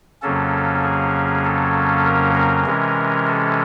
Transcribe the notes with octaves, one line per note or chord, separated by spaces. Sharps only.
F2 C#3 F#3 A#3 C#4 A4
G#4
A4
A#4
A#4
C3 E3 G#3 C#4
A4